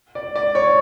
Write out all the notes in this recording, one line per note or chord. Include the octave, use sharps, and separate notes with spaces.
D5
D5
C#5